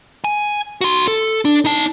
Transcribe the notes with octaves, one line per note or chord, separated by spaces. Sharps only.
G#5
F#4 C6
A4
D4
D#4 A5